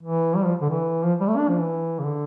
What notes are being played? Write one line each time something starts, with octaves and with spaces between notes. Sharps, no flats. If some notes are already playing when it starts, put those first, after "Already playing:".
E3
G3
F3
D3
E3
F3
G3
A3
D4
F3
E3
C#3
D3